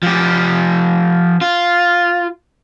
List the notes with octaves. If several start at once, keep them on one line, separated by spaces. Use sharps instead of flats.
F3 G4
F4